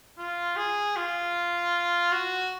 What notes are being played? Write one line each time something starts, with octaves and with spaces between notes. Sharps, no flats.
F4
G#4
F4
F#4